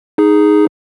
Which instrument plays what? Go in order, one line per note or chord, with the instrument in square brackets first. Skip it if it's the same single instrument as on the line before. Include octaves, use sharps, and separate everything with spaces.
[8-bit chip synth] D#4 G#4